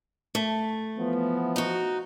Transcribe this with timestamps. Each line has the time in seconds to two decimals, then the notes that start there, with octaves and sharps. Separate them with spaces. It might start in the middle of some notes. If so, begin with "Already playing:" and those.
0.35 A3
0.98 E3 F3 B3
1.56 D#4 F#4